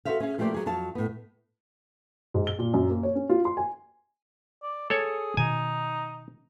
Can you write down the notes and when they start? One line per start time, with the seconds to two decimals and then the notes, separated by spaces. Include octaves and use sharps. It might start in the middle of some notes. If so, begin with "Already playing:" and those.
0.05 F#4 A4 A#4 C5 E5 F5
0.20 C#4 G#4
0.38 F3 A3 A#3 G4 C5 D5
0.54 F#3 G#4
0.66 F2 F#3 F5 A5
0.95 A2 B3
2.34 G#2
2.47 G7
2.59 A#2
2.74 F#2
2.90 A#3
3.03 C#5
3.15 C#4
3.29 F4
3.45 C6
3.57 G#5
4.63 D5
4.90 G#4 A4 C#5
5.37 B2 D#3 D#4 G#5